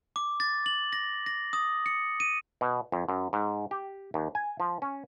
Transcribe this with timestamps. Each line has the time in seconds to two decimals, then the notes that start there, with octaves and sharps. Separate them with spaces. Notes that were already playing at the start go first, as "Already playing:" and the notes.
0.16 D6
0.40 A6
0.66 F#7
0.93 A#6
1.26 A#6
1.53 D#6
1.86 C#7
2.20 D#7
2.61 B2
2.92 F2
3.09 F#2
3.33 G#2
3.71 G4
4.14 D#2
4.35 G#5
4.60 F3
4.82 C#4